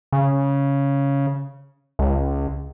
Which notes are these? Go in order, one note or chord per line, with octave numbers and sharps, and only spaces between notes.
C#3
C#2